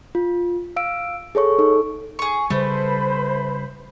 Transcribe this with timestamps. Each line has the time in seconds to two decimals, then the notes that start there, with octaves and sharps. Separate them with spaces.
0.15 F4
0.76 F5 E6 D7
1.35 G#4 A4 C#5 C#6
1.58 D#4 A4
2.19 G#4 C#6
2.50 C#3 G3 A3 B4 C5 B5